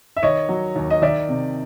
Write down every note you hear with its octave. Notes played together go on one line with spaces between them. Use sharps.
E5
D#3 C#5 D#5
F#3
D#2
D#5
D#3 D5 E5
C3